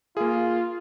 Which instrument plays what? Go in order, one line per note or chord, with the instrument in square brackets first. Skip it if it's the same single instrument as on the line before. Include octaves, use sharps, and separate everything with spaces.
[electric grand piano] A#3 G#4 [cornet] F4